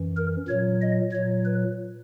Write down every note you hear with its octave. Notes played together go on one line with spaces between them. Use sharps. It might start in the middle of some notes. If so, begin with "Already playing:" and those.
Already playing: F#2 E3
A#4
A#2 F#3 C#5
D#5
A#2 F#3 C#5
B4